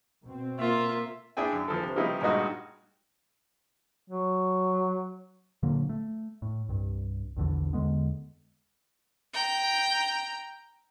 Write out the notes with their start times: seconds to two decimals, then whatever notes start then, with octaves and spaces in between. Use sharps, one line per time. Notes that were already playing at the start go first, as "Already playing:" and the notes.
0.25 B2 C4
0.59 A#3 F4 E5
1.37 D4 E4 G#4 G5 G#5
1.53 F#2
1.68 E3 F3 A4
1.83 C3
1.96 C#3 F3 G3 B3 D#4 E4
2.22 G2 A#2 G#3 D#4 F#4
4.10 F#3
5.63 A#2 D3 F#3 A#3
5.89 A3
6.42 A2
6.69 C2 G2
7.36 A#1 E2 D3 E3
7.73 E2 D3 G#3 B3
9.34 G5 A#5